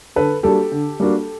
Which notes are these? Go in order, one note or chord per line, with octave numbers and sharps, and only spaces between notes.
D3 A4 B4
G3 A#3 D4 F#4 G4 A4
D3
G3 A#3 D4 F#4